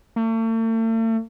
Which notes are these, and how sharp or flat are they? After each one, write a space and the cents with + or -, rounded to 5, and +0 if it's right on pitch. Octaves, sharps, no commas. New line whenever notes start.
A3 +40